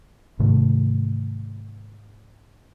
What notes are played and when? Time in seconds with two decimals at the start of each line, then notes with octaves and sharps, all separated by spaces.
0.39 G#2 C3 D#3 A3